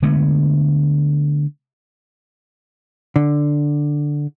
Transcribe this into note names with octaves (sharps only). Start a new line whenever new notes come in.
D3 G#3 A3 B3
D3